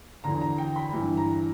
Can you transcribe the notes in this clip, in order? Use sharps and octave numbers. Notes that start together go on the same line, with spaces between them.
E2 D3 A#5
A#5
G5
B5
G2 E3
A#5